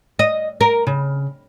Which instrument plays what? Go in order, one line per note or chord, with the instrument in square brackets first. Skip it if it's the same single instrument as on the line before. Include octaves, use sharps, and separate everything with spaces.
[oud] D#5
A#4
C#3